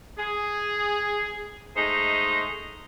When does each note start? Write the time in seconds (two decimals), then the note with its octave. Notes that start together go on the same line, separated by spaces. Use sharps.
0.19 G#4
1.76 G#3 A3 D#4 C5 D#5